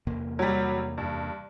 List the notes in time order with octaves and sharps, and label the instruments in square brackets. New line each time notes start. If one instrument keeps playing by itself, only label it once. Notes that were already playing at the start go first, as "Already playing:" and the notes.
[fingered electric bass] E2 C3 A#3
[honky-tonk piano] F#3 G3
G2